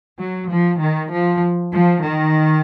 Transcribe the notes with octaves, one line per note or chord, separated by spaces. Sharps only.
F#3
F3
D#3
F3
F3
D#3